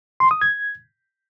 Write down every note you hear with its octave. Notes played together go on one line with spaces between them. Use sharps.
C6
D#6
G#6